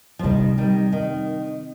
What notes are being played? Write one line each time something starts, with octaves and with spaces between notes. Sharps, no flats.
F3
C3 D#3 G3
D#3 G3
D#3